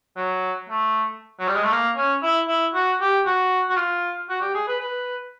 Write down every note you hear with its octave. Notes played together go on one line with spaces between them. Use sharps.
F#3
A3
F#3
G3
G#3
A3
A#3
C#4
E4
E4
F#4
G4
F#4
F#4
F4
F#4
G4
G#4
B4
B4